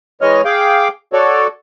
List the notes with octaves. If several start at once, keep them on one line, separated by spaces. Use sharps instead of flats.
E3 G#3 C#5 D#5 F6
G#4 F5 G5 D6
F#4 A4 C#5 D5